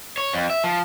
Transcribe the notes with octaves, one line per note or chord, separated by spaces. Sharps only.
C#5
F2
E5
F3